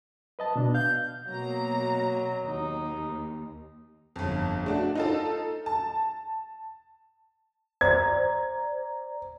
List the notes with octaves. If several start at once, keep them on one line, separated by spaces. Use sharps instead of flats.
B4 D#5 A5
B2 D4
F5 G6
B2 F#3 A#3 A#5
D#2 D#4
G1 F2
A3 D4 F#4
D#4 F4 A4
A5
C5 D5 A#5 G#6